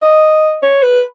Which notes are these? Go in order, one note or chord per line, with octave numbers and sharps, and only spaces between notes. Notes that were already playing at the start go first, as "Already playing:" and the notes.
D#5
C#5
B4